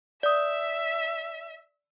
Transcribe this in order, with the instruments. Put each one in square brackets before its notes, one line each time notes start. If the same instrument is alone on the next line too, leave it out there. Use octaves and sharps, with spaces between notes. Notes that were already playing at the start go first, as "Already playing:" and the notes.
[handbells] D5 D#6 [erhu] E5